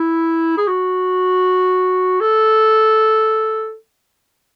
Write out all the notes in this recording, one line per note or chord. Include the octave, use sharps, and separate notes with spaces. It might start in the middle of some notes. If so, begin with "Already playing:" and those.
Already playing: E4
G#4
F#4
A4